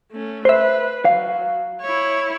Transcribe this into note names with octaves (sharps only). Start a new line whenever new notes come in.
A3 C#4
B4 C5 E5
F#3 F5
E4 C#5